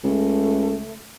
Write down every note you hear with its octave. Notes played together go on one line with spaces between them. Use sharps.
C#2 A3